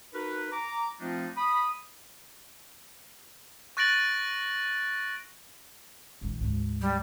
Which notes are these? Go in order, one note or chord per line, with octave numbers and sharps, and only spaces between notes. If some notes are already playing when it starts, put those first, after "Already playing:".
D#4 F#4 A#4 B4
A#5 D6
F3 A3 C4 D4 D#4 F4
B5 D#6
C#6 F#6 A6 A#6 D7 F#7
A#1 D#3
D2 G#2
G3